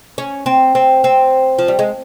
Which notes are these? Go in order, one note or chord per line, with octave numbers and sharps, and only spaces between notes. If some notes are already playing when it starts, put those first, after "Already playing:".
C#4
C4
C4
C4
F3
G3
G#3